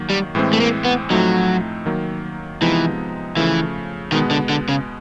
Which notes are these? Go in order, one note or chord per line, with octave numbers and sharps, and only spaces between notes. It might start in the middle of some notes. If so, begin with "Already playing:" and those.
Already playing: D#3 F#3 A#3
G3
A2 E3 G#3 C4
A3
A#3
B3
A2 F3 F#3 A3 C4 D#4
D#3 F#3 A#3
C3 E3 F3 G#3 B3 D#4
C#3 E3 F3 A3
B2 D#3 G#3 B3
D3
D3
C#3